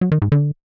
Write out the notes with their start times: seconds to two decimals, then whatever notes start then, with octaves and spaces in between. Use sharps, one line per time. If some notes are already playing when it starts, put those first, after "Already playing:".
0.01 F#3
0.12 D#3
0.22 G#2
0.32 D3